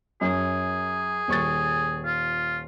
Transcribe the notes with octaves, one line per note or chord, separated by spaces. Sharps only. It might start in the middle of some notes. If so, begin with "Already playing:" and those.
F#2 G#4
D#1 C#6 A6
F4